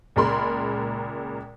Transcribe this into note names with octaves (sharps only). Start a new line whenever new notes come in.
C#2 A#2 G#4 A#4 B5 C6